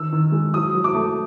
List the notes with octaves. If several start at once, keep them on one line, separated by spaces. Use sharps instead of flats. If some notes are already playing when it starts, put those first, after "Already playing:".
Already playing: D#3 E6
D#3
G#3
F#3 D#6
F#3
D6
A3